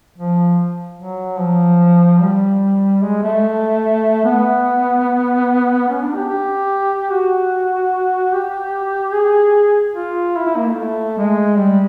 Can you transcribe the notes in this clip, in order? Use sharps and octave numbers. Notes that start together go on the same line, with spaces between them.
F3
F#3
F3
G3
G#3
A3
B3
C#4
D4
G4
G4
F#4
G4
G#4
F4
E4
E4
A#3
A3
G#3
G3